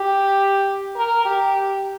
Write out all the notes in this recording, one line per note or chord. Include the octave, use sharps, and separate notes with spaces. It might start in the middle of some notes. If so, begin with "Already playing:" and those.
Already playing: G4
A#4
G4